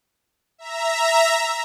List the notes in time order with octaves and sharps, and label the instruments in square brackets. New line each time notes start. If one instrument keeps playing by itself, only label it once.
[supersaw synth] E5 A#5